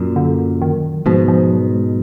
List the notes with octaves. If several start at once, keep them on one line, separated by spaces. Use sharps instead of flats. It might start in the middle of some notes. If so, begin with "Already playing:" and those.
Already playing: F#2 A#2
D3
D#3
G#2 B2 F3
F3
F#3
G#3